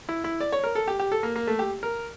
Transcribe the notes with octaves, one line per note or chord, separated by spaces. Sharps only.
E4
E4
D5
C#5
A#4
A4
G4
G4
A4
A#3
A#3
A3
G4
A#4